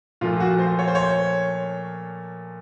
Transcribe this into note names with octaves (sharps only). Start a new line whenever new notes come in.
A#2 F3 A3 F4
F#4
C5
C#5
C5
C#5